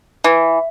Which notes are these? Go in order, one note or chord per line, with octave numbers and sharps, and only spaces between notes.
E3